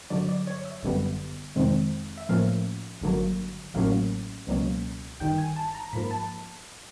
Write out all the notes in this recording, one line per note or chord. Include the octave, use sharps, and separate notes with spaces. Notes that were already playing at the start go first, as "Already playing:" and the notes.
G2 D3 F#3 D5
D5
C#5
E5
G1 F#2 D3 G3 B3
F2 C3 D#3 G#3 C4
E5
A2 F3 A#3 C#4 F5
G#1 G2 D3 F#3 A#3
A1 A2 F#3 A#3 C#4 F5
C#2 B2 F#3 A#3 C#4
G1 G2 D#3 G5
G#5
A5
A#5
G#2 F3 A#3 B5
A5